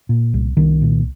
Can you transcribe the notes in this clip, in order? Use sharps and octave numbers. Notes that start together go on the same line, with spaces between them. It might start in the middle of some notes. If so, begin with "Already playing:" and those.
A#2
C2
C2 D#3
A#2